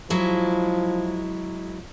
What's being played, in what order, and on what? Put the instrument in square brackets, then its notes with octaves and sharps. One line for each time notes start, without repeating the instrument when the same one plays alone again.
[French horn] F3 [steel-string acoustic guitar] F#3 G#3 E4